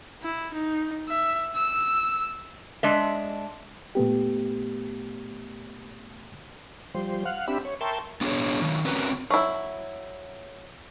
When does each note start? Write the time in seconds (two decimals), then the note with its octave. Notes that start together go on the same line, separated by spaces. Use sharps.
0.23 E4
0.54 D#4
1.09 E5
1.55 E6
2.83 G#3 D4 D#5 E5
3.95 A#2 A3 B3 G4
6.95 F3 G3 C5
7.25 F5 F#5
7.48 C4 D4 G4 E5 B5
7.65 C#5
7.81 A#4 E5 G5 A5 C6 C#6
8.21 B3 D4 F#4 G#4 C#5
8.61 D#3 F#3
8.85 C4 C#4 F#4 A#4 B4
9.30 F#3 E4